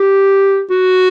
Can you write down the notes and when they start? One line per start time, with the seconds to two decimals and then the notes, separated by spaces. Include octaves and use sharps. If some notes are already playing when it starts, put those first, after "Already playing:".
Already playing: G4
0.71 F#4